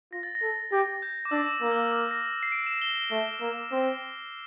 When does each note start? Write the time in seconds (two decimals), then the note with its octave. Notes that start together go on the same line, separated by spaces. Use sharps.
0.12 F4 A#6
0.23 A6
0.35 A#6
0.42 A4
0.72 G4 A#6
1.02 G6
1.25 D6
1.31 D4 E6
1.46 D6
1.62 A#3 E6
1.72 F6
1.76 E6
1.92 D6
2.11 A#6
2.43 C7
2.52 D7
2.66 E7
2.82 G7
2.96 G7
3.11 A3
3.41 A#3
3.72 C4